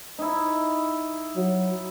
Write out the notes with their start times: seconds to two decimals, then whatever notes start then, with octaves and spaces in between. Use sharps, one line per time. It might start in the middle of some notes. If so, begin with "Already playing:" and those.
0.19 D#4 E4
1.36 F#3